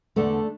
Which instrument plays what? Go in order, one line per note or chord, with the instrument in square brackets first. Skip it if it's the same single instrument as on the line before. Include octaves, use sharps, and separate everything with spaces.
[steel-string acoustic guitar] E2 D3 A3 D4